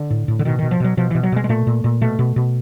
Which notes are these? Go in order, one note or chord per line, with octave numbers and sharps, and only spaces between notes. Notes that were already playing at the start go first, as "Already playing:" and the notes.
Already playing: D3
A2
A2
D3
B2 D#3
B2 D#3
F3
B2 F#3
B2 F3
B2 E3
F#3
B2 G#3
G#3
A#2 A3
A#2
A#2
B2 A3
B2
B2